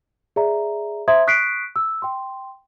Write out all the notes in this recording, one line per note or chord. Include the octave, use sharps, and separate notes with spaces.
G#4 D5 E5 A#5
C5 E5 A#5 C6 D#6 G#6
C#6 D#6 F#6 B6 C7 D7
E6
G5 C6